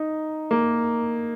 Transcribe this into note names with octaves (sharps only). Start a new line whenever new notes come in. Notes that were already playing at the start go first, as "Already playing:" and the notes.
Already playing: D#4
A#3